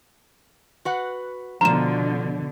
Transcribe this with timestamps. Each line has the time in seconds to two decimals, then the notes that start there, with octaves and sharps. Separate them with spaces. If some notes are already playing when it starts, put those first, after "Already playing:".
0.85 F#4 B4 F#5
1.61 B2 D3 F3 D4 F4 A#5 E7